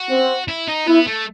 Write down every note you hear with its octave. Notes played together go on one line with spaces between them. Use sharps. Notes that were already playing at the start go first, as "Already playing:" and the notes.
Already playing: F#4
C4
E4
D#4
B3 E4
A3